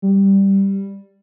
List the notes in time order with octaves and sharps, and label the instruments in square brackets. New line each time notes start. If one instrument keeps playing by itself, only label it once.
[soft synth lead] G3